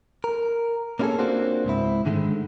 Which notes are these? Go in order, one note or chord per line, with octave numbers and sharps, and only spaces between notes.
A#4
A#3 C#4 E4 F4 G#4 A4
A#3 C4 D4 F4 F#4 C5
C#2 G#2 C4 E4
G#2 D3 D#3 G#3 A3